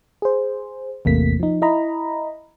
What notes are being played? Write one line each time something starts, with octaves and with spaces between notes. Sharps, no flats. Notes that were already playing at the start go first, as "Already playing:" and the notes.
G#4 C5
A1 E2 C3 A3 A#3 B6
F3 D#4
E4 D#5 A#5 B5